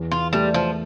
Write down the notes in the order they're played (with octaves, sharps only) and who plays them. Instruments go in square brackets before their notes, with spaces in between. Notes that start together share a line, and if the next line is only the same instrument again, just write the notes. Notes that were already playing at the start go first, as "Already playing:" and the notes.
Already playing: [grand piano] E2
[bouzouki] F4
[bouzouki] G3 [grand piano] A3
[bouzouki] F3